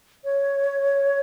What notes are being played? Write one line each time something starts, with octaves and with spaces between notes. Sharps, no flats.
C#5